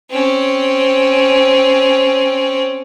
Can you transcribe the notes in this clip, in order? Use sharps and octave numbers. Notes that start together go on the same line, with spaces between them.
C4 C#4